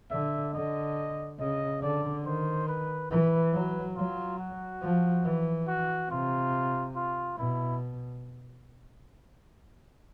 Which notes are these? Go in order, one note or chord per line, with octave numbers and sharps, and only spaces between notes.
D3 E5
D3 D#5
C#3 D#5
D3 D5
D#3 C5
B4
E3 B4
F#3
F#3 F4
F#4
F3
E3
F#4
C3 F4
F4
B2 E4